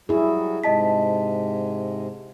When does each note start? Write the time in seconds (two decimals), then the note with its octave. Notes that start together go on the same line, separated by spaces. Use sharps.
0.09 F#3 G3 E4 F#4 G#4
0.64 G#2 C3 G#3 D#5 A5 B6